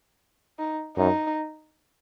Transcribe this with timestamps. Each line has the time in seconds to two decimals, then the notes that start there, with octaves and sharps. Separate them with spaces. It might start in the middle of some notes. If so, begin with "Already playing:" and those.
0.59 D#4
0.97 F#2 D#4